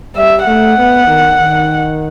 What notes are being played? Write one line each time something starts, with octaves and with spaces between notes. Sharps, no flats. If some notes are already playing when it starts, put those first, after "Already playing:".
G3 E5
A3 F#5
B3
D#3
D#3